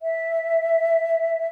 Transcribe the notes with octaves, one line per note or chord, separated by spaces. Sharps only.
E5